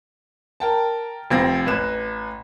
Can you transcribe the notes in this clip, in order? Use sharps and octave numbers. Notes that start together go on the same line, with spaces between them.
A#4 G5 A5
F1 F3 C4 G5 A#6
A1 B4 E7